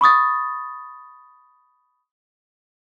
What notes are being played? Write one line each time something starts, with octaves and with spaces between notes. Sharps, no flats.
B5 C#6 D#6 A6